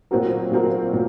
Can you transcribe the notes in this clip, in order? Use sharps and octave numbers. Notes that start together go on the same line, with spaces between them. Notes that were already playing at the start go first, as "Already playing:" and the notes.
A#2 F#3 C4 F#4 A#4
A#2 F#3 C4 F#4 A#4
A#2 F#3 C4